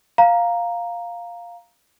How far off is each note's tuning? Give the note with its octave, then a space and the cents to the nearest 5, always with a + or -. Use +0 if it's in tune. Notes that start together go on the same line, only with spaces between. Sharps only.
F5 +0 A#5 +0